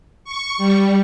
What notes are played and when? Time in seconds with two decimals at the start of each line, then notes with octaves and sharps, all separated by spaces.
0.24 C#6
0.58 G3